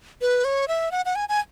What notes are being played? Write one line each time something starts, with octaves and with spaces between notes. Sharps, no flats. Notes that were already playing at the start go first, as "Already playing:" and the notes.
B4
C#5
E5
F#5
F#5
G#5
G#5